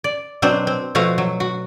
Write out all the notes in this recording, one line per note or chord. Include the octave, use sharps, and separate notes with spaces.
D5
B2 F#3 C4 D4 C5
C4
B2 F3 A3 F#4 F5
F#3
F#4